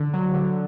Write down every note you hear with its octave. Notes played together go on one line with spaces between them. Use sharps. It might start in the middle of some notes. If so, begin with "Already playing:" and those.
Already playing: D3
F#3
D3